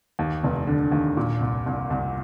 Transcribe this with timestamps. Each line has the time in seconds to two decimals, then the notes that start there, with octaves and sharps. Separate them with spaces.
0.19 D#2
0.44 F1
0.67 D3
0.92 D#2
1.17 A#2
1.41 C2
1.66 C2
1.90 C2